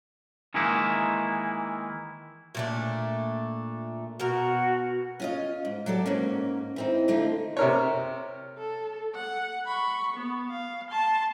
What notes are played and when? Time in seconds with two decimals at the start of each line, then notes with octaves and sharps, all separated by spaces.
0.54 D#3 E3 G#3 A#3 D#4 E4
2.55 A#2 A3 D4
4.20 B2 F#4 A#4 F#5
5.20 C#4 F4 D#5
5.65 G#2
5.86 F#3 G4 A4 D5
6.06 G#2 A#3 C#4
6.76 E3 C4 D#4
7.08 D3 A3 D#4 F4
7.57 C3 A#4 C#5
8.58 A4
9.15 F#5
9.66 B5 C#6
10.16 B3
10.50 F5
10.91 A5 C6